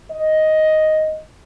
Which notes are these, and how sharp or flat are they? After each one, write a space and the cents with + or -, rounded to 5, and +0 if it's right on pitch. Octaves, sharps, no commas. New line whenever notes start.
D#5 +5